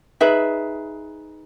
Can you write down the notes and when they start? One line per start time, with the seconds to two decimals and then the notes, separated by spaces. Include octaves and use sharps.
0.21 D#4 G#4 B4 E5